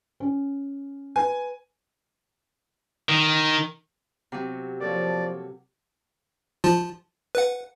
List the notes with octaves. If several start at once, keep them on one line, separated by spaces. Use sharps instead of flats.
C#4
B4 G#5
D#3
C3 F#3
F3 A#3 A4 C#5 D5
F3 F4 A5
B4 F#5